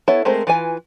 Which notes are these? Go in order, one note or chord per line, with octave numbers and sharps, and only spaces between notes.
B3 E4 A4 C#5
G#3 A3 C4 A#4 C5
E3 F4 B4 G#5